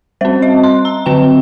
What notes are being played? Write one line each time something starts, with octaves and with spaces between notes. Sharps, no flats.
G3 C4 C5
D#5
C6
A#5
D3 F#3 C4 G5